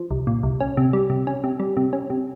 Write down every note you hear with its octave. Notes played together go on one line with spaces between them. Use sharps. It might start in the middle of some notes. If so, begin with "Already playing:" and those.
Already playing: F3
C2
A#2
C2
C#4
C3
G3
C3
C#4
C3
G3
C3
C#4
C3